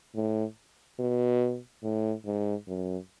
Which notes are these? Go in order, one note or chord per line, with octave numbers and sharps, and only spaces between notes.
A2
B2
A2
G#2
F#2